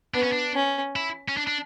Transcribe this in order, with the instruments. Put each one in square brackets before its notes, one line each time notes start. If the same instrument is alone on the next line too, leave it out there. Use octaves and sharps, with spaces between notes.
[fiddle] B3 [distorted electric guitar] D4
[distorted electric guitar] C#4
D4
[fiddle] C#4
[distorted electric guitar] E4
C#4
D4
D4